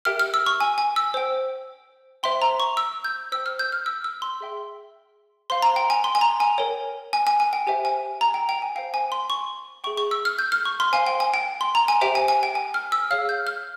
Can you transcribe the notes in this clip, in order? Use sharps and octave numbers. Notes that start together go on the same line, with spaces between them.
G4 A#4 E5 G5 F6
F6
E6
C#6
G#5
G#5
E6
C5 G5
C5 E5 G5 C6
A#5
C#6
E6
G6
C5 G5 E6
F6
G6
F6
E6
E6
C6
G#4 E5 G5
C5 F5 C6
A#5
G5
G#5
C6
G#5
A#5
G#5
A#4 C#5 G5
G#5
G#5
G#5
G5
G4 C5 E5 G5 G#5
G#5
A#5
G5
G5
G#5
C5 F5 G5
G#5
C6
C#6
G#4 E5 G5 C#6
C#6
E6
F6
G6
F6
C#6
C6
C5 F5 G#5
G5
G#5
G5
C6
A#5
G#5
G4 C5 E5 G5
G#5
G#5
G5
G#5
F6
E6
G#4 C#5 F5 F6
G6
F6